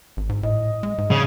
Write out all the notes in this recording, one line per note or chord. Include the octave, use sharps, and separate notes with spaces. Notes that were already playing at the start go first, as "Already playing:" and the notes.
G#1
G#2
A2 D#5
G#3
G#2
C#3